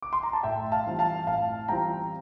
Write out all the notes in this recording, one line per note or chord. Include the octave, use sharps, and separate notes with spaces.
D6
C6
A#5
A5
A2 E5 G5
F5 A5
E3 G3 C4 F4
F5 A5
A2 F5 A5
E3 G3 C4 F4 G5 A#5